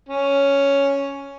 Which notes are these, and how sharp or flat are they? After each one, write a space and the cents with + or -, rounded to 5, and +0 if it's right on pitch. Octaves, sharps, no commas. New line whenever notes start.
C#4 +5